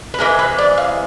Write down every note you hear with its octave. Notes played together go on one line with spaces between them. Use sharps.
B4
C3 E3 G#3 A#4
B4
D5
F5